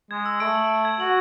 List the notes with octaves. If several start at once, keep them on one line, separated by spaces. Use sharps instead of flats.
G#3 G#6
E6
A3 D7
F#7
D7
G#6
F#4 F#7